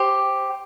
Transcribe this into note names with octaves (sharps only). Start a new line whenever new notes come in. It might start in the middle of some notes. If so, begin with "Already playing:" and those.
Already playing: G4 C5